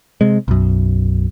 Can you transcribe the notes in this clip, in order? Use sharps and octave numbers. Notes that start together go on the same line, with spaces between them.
C3 G#3
B1 F#2